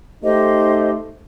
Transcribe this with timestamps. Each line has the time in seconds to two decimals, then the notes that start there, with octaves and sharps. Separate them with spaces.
0.24 A3 D#4 G4 C5 D#5